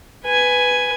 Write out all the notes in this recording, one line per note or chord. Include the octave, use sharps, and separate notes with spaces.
B4 G#5